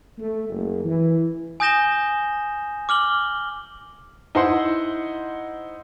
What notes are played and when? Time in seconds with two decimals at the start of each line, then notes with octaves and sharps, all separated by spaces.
0.19 A3
0.50 F#1
0.85 E3
1.60 G#5 D#6 G6 A#6 E7 G7
2.89 D6 F6 F#7 G7
4.35 D#4 E4 C5 F#5 C6